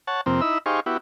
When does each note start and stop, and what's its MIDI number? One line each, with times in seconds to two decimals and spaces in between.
0.07 0.21 73
0.07 0.21 78
0.07 0.21 81
0.26 0.41 41
0.26 0.41 48
0.26 0.41 58
0.26 0.41 60
0.41 0.58 63
0.41 0.58 64
0.41 0.58 83
0.41 0.58 88
0.66 0.80 63
0.66 0.80 67
0.66 0.80 68
0.66 0.80 72
0.66 0.80 77
0.66 0.80 85
0.86 0.97 59
0.86 0.97 64
0.86 0.97 66
0.86 0.97 67